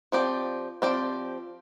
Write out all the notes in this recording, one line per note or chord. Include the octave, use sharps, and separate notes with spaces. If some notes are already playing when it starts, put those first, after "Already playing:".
F3 C4 G4 D5
F3 C4 G4 D5